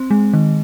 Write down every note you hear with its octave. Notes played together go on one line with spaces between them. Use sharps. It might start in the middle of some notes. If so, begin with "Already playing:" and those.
Already playing: C4
G#3
D#3